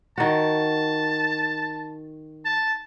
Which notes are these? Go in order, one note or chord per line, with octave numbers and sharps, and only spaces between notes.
D#3 F#4 A5
A5